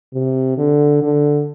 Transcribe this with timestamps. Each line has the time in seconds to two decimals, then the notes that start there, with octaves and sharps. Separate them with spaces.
0.14 C3
0.58 D3
1.02 D3